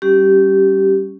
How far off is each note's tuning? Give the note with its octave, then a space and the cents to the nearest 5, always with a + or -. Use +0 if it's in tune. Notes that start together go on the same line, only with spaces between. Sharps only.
G3 -5 C#4 +0 G4 -20